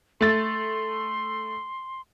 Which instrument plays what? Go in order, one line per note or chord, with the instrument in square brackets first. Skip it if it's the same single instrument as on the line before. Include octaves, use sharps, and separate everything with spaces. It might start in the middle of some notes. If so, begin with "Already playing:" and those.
[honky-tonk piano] A3 A6 [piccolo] C6